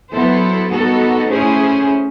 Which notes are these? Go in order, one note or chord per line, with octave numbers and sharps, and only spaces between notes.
F#3 B3 E4 A4 C5
G3 B3 D#4 F#4 A4
A3 C#4 E4 G#4 C5